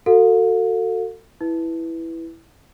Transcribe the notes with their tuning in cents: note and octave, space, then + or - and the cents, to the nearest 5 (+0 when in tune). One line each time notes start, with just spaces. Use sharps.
F#4 +0 A4 +30 F5 +40
E4 +0 B4 +0